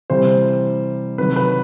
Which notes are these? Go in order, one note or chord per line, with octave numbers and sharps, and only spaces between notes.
C3 E3 G3 C5
C3 D#3 F#3 B4
B4